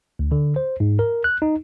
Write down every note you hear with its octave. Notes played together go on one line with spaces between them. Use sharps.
D2
D3
C5
G#2
A#4
F#6
D#4